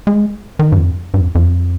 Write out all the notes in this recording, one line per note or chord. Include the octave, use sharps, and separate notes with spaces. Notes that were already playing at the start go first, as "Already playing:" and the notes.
G#3
D#3
G2
F2
G2
F2
F2